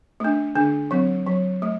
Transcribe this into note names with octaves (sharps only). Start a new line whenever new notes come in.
A3 D4
D3 D4
F#3 C4
F#3
A3